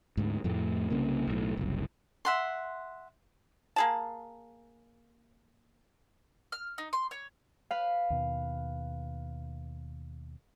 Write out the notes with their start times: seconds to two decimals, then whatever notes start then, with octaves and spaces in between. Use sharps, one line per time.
0.17 D2 G#2
0.44 F2 A2 A3
0.90 C2 C#3 A#3
1.27 B1 A2
1.57 F#1 C2
2.25 E5 F#5 C6
3.76 A#3 G#4 A5
6.52 F6
6.78 D#4
6.93 C6
7.11 C#5
7.71 B4 F5
8.10 D#2 B2